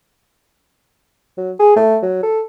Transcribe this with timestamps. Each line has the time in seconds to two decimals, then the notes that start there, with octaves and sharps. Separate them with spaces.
1.38 F#3
1.60 G#4
1.76 A3
2.03 F#3
2.23 A4